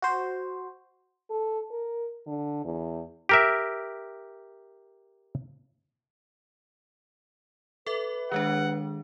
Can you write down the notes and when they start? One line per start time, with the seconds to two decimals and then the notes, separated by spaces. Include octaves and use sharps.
0.02 F#4 C5
1.30 A4
1.71 A#4
2.27 D3
2.64 E2
3.29 G4 A#4 E5
7.87 A4 B4 E5 D6
8.32 D#3 G#3 D4 F#5